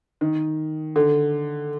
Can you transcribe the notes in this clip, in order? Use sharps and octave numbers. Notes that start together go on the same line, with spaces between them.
D#3
D3